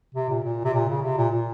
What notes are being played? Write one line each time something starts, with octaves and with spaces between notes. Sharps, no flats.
C3
A#2
A#2
C3
A#2
C#3
C3
A#2
A#2